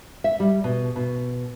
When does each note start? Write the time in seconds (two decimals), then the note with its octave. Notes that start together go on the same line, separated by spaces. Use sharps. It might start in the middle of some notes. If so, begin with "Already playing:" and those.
0.24 E5
0.40 G3
0.64 B2
0.96 B2